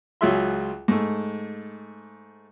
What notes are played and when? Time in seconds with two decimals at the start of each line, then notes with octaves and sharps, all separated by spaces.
0.21 C#2 F#3 F4 G#4 E5 C6
0.88 G#2 A3